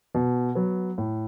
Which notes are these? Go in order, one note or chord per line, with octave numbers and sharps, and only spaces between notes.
B2
F#3 B3
A2